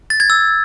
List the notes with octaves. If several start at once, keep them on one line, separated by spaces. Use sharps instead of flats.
A6
G#6
E6